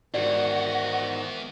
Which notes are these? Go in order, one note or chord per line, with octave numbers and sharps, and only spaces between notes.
E2 G#2 D#3 F#4 D5